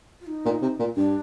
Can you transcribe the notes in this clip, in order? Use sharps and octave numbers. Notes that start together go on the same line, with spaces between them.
F4
D#4
A#2
C3
A#2
G2 D4